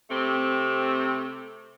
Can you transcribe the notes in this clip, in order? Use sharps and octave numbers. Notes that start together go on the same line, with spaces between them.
C3 A3 C4